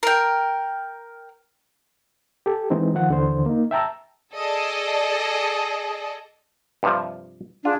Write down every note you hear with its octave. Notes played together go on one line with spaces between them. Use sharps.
A#4 G5
G4 A4
E3 G#3 C4 D#4
D#3 F3 F#5
D#2 D3 E3 C5
A#3 D#4
E5 G5 A5 A#5 E6
G#4 A4 D5 D#5
G2 C3 F3
D4 F4 G#4